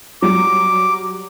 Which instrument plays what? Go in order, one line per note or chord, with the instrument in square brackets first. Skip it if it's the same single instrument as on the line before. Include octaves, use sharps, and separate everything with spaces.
[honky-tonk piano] F#3 G3 [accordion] D6